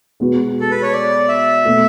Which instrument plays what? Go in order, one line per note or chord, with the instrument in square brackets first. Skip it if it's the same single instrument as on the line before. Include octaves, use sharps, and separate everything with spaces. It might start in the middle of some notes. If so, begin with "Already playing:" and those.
[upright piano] B2 G#3 B3 F#4
[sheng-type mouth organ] A4
B4
C#5
D5
E5
[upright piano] B2 A3